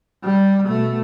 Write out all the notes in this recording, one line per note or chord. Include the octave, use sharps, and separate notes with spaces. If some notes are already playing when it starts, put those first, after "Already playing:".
G3
B2 A3